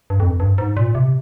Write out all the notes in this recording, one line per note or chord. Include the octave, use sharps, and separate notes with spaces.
G2
F2
G2
G#2
A#2
C3